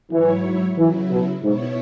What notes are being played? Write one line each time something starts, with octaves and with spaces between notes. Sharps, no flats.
G#2 E3 F#3 E4 C#5
C#3 E3 F#3 E4
B2
G#2 B2 B3 E4 C#5